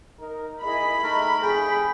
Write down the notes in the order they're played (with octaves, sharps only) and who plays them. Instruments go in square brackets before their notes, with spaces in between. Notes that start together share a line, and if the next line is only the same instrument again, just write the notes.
[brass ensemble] D#4 A#4
[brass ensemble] E4 G#4 D#5 [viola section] B5
[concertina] A3 A#4 [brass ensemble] D#4
[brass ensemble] F2 C3 [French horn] G#4 [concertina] G5